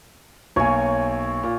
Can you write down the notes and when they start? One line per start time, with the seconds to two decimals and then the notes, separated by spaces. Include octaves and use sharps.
0.56 B1 A#3 C#5 G#5
1.43 A#2